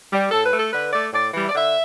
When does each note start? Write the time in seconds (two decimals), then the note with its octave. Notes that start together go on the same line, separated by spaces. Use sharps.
0.12 G3
0.31 A2 A4
0.45 B4
0.52 A3
0.58 A4
0.72 D3 B4
0.93 A3 D5
1.13 A2 D5
1.33 E3 G3
1.42 E5
1.49 D5
1.54 D3 E5